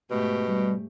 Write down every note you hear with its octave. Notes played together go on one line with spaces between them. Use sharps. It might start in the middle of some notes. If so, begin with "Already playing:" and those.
G#2 B2 A3 G4
G3